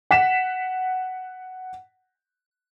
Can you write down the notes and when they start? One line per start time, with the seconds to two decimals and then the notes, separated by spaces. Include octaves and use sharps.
0.11 F#5 B6 E7